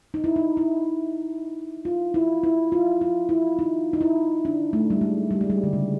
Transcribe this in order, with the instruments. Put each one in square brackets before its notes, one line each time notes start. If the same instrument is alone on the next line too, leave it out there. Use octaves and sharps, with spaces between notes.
[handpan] D#4
E4
D#4
E4
F4
E4
E4
F4
F4
E4
D#4
D#4
E4
D4
A3
G3
G#3
G3
G#3
G3
D3
C#3